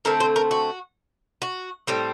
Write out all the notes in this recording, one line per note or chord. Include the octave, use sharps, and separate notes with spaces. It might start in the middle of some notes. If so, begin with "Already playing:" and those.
D3 A3 C4 A#4
C5
A#4
F#4
F#4
A2 G3 C4